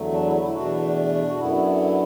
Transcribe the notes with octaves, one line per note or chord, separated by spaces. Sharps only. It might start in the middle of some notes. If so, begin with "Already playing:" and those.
Already playing: E2 D3 F#3 A3
D4
E4
E4
E2 B2 A3 D4 F#4
D4
F#4
F#2 D3 B3 E4